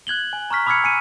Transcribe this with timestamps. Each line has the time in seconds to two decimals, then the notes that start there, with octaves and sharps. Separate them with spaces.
0.07 F#6 G#6 F#7 G7
0.33 G#5
0.50 A#5 C#6 F6 B6
0.66 B5 D6 E6 F6 G#6 C#7
0.84 G#5 C#7 D#7